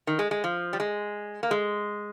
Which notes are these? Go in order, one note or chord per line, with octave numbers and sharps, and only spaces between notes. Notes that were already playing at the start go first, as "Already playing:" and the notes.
D#3
G#3
G#3
F3
G3
G#3
A#3
G#3